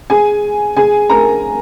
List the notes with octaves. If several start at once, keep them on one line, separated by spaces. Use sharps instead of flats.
G#4 G#5
G#4 G#5
A#4 A#5